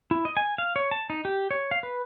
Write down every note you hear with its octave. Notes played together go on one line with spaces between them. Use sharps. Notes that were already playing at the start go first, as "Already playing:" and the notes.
E4
D#5
G#5
F5
C#5
A5
D#4
G4
C#5
F5
B4